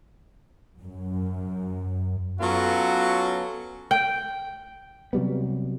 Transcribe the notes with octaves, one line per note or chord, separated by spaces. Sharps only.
F#2
F#3 B3 C#4 F4 F#4 A4
G5
C3 F#3 G3 B3